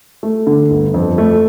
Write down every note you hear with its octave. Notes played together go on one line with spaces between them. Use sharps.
A3
D3
G1
F2
A3